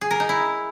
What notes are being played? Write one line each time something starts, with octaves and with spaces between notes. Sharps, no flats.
G#4
A#4
D#4
E4